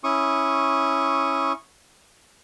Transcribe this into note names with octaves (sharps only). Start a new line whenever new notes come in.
C#4 E4 C#6 D#6